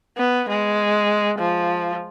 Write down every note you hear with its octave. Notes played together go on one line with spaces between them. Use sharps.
B3
G#3
F3